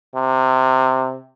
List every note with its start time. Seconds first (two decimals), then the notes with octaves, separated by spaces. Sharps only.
0.15 C3